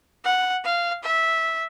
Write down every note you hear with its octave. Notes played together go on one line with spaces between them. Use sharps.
F#5
F5
E5